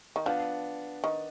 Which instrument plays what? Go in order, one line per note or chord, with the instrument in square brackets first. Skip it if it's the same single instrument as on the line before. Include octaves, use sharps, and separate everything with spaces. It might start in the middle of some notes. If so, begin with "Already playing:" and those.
[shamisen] D#3
[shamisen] F3 [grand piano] B3 D4
[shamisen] D#3